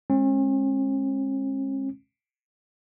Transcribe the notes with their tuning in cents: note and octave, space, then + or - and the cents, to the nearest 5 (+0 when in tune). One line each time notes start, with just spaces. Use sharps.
G#3 +10 C#4 -45